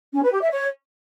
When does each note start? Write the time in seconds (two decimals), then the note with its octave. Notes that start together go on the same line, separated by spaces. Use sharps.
0.13 C#4
0.22 B4
0.32 G4
0.41 E5
0.50 C#5